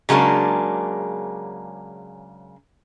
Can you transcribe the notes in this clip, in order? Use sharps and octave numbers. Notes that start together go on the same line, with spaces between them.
C#3 F#3 G#3 A#3 D4